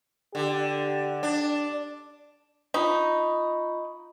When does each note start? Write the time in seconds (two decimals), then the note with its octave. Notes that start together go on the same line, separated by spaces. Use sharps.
0.35 D3 G4
1.23 D4
2.74 D#4 F4 B5 C#6